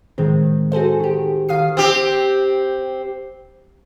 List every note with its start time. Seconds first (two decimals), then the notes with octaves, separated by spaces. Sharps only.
0.18 A2 D#3 G#3 C4
0.72 F#4 G#4 A4 C5
1.00 D#3 G4
1.49 D#3 F5 D#6 C7
1.77 C4 G4